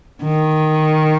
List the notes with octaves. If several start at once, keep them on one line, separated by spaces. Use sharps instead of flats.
D#3